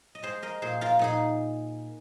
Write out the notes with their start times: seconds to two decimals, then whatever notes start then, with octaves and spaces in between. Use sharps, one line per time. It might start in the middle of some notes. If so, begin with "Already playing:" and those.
0.15 D#5
0.23 G#3 G#4 C5
0.42 A#4 D#5
0.62 A#2 G#4 C5
0.81 F4 A#4
0.99 A#2 D#4 G#4